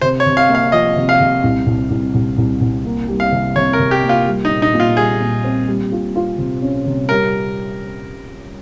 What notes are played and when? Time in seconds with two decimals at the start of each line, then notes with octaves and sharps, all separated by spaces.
0.01 C3 C5
0.20 C#5
0.26 C3
0.37 F5
0.49 A#3
0.55 F5
0.72 F3 D#5
0.96 C3
1.09 F5
1.20 C3
1.44 C2
1.67 C2
1.90 C2
2.15 C2
2.38 C2
2.61 C2
2.85 A#3
3.08 G3
3.20 F5
3.32 C3
3.56 C3 C#5
3.73 A#4
3.79 C3
3.91 G4
4.03 A#3
4.09 F4
4.27 G3
4.45 D#4
4.50 A#2
4.62 D#4
4.74 A#2
4.80 F4
4.97 G3 G#4
5.20 A#2
5.44 C4
5.68 G3
5.92 F4
6.15 F4
6.38 C3
6.62 C#4
6.86 C3
7.09 G3 A#4